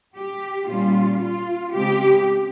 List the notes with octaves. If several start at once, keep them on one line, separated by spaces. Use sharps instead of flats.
G4
A#2 G3 C#4 F4
F4
C#3 G#3 C4 G4